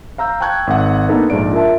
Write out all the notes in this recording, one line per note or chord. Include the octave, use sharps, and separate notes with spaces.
F5 A#5 E6 G6
G5 A5 C#6 F#6 G#6
G#1 F#5
A#3 B3 D4 D#4 A4 B4
A#1 G#2 D4 D5 D7
F4 A#4 E5 A5